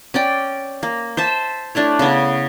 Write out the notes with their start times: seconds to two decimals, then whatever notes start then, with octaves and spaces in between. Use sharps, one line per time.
0.14 C#4 D5 G5
0.83 A#3
1.17 C5 E5 A5
1.75 A3 D4 E4 C#5
1.99 C#3 B3